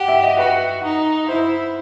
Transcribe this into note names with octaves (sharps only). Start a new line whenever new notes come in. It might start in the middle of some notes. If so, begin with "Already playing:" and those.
Already playing: G4 F#5
E5
D#5
F#4 B4
D#4
E4 C5